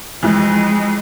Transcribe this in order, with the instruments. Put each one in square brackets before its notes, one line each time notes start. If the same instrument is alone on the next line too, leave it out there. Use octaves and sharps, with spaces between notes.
[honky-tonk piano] F2 E3 [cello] G#3